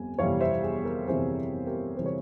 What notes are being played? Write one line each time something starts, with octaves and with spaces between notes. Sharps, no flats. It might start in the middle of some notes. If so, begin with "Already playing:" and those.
Already playing: G1 F2 G3 G#5
G1 F2 C3 E3 G3 C#5 F5
C5 E5
G#4
G4 A#4
G1 F2 C3 E3 G3 G#4 C5
G4 A#4
C3 E3 G3 C5
C#5